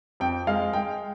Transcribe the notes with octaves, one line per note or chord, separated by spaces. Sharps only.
F2 G5
G#3 F5
G#3 G5